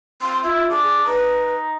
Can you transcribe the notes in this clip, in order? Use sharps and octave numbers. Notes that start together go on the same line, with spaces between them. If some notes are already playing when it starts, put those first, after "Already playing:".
C4 C6
E4 F4
D4 G#4
D#4 B4